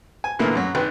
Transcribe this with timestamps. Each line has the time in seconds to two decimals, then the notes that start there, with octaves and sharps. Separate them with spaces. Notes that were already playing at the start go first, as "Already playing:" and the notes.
0.24 G#5
0.39 A#2 D3 E3 A#3 B3
0.55 F#2 F#3
0.75 G#1 B4 G5